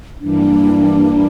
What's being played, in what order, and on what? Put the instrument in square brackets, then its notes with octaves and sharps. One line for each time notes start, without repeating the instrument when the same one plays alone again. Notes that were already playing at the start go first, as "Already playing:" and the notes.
[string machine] G2 E3 G3 A#3 [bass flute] D4